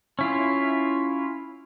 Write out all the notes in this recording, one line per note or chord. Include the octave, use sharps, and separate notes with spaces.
C#4 E4 F4